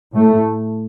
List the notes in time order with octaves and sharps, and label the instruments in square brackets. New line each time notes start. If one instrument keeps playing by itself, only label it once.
[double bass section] A2 A3